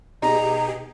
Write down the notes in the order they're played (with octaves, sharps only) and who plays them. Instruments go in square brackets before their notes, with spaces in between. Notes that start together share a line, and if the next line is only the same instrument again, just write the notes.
[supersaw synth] B2 G4 G#4 [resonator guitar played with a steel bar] D#4 [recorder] A#5